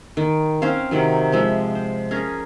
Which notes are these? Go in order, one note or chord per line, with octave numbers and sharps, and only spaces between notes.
D#3
C4 C#4 C5 F5
C3 D#3 F#3
F3 G#3 E5
C5
C#4 G#4 A#4